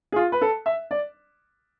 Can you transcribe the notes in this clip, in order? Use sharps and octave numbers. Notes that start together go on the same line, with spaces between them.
G#4
F4
B4
A4
E5
D5